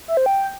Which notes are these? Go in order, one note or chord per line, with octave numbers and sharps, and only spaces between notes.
E5
C5
G5